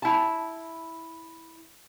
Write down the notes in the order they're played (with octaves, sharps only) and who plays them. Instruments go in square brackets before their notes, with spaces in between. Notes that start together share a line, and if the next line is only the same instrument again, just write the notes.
[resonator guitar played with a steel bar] E4 A5